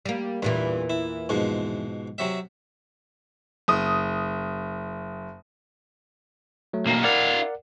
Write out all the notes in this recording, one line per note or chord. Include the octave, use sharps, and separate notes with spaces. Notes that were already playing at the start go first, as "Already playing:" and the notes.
G3 A#3
E2 G2 A#2 E3
E4
G#2 B2 F3
C3 F#3 E5
F#1 D#6
F#3 A3
B1 A#3
E4 A#4 D5 F5 F#5